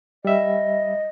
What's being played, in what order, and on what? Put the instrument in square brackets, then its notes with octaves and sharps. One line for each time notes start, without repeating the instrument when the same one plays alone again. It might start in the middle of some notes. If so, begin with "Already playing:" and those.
[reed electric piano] G3 E5 [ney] D#5